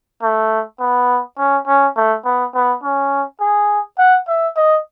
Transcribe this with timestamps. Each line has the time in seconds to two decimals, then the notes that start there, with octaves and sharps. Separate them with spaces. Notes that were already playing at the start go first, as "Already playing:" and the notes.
0.22 A3
0.80 B3
1.38 C#4
1.67 C#4
1.96 A3
2.25 B3
2.54 B3
2.83 C#4
3.40 G#4
3.99 F#5
4.28 E5
4.57 D#5